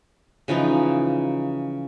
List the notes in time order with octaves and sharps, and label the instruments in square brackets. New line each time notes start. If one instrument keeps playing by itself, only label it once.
[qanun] C#3 E3 F3 D#4